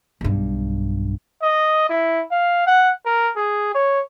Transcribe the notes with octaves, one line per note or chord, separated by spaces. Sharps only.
B1 G2
D#5
E4
F5
F#5
A#4
G#4
C#5